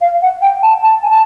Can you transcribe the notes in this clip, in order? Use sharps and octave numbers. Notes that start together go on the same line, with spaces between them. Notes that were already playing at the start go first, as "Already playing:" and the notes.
F5
F#5
G5
A5
A5
G#5
A5